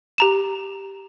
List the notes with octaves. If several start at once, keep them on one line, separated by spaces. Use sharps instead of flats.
G4 A#5 E7